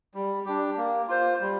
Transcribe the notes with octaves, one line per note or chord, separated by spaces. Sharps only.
G3
D4 G4
A#3
F4 C5
G3